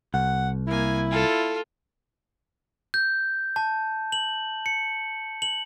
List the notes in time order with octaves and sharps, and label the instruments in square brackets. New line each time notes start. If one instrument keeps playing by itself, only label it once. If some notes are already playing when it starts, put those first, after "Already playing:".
[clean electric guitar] C2 [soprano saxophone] F#5
[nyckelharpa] A#3 G#5 [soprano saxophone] E4
[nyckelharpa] F4 [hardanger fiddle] A4
[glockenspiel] G6
A5
F#7
C#7
F#7